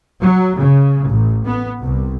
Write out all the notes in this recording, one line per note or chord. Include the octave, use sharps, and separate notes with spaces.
F#3
C#3
A1
B3
C2